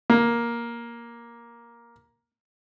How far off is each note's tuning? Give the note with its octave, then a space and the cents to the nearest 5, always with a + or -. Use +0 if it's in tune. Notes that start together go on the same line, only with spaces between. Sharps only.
A#3 +10